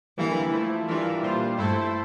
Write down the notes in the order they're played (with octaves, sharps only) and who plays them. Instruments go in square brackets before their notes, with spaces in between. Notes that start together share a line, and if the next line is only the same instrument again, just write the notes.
[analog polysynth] D3 G3 A#3 E4 [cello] E3
[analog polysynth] F3 A3 E4
[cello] E3 [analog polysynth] G3 D4 F4 A#4 E5
[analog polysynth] A#2 G3 D4 F4 C5
[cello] G2 [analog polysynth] A3 E4 A4 C5